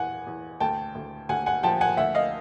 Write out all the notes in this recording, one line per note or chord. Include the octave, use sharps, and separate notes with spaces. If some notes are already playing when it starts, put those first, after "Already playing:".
Already playing: E2 F#5 G#5
E2
D2 G5 A5
D2
D2 F#5 G#5
F#5 G#5
F3 G5 A5
F#5 G#5
D2 E5 F#5
D#5 F5